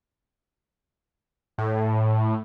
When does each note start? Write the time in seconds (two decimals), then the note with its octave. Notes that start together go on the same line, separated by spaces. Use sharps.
1.58 A2